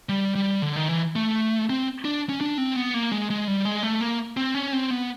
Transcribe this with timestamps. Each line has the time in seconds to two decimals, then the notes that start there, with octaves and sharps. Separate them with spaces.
0.09 G3
0.35 G3
0.62 D3
0.76 D#3
0.89 E3
1.16 A3
1.70 C4
2.05 D4
2.29 C#4
2.41 D4
2.58 C4
2.76 B3
2.94 A#3
3.12 G#3
3.30 G#3
3.48 G3
3.65 G#3
3.83 A3
4.01 A#3
4.37 C4
4.54 C#4
4.73 C4
4.90 B3